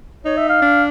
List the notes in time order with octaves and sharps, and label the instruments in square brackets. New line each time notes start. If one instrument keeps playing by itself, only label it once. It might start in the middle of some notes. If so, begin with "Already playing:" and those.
[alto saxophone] D#4 [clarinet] C#5
[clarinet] E5
F5
[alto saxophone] D4